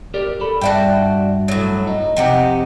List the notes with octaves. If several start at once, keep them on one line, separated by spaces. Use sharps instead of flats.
G4 A#4 D5
A4 B5
G2 F#4 D5 E5 G5 A5
A2 F#3
D#4
F2 C3 D#4 G4 F#5